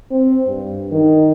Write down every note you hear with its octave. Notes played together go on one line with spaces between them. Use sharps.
C4
G2
D#3